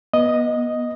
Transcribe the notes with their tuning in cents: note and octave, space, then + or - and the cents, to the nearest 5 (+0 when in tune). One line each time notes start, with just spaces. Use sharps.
B3 -30 D#5 +0